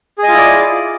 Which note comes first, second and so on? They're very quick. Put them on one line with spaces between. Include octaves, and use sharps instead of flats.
G#4 D#5 F4 E4 D5